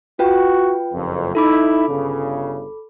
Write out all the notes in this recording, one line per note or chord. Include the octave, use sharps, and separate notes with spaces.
F4 F#4 B4 G5
F#1 F2
D#4 E4 A4 B5 D6
G1 C#3